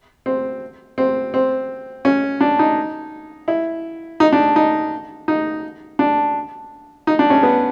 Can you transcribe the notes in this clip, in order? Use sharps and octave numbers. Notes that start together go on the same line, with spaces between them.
C4
C4
C4
C#4
D4
D#4
E4
D#4
D4
D#4
D#4
D4
D#4
D4
C#4
B3